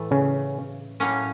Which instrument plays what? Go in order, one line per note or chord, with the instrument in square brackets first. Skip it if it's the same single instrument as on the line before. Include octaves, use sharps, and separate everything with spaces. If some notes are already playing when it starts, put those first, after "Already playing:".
Already playing: [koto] A2 E3 A3
[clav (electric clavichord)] C#3 C#4
[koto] A2 F#3 A#3 C#4